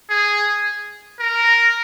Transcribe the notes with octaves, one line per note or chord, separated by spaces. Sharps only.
G#4
A#4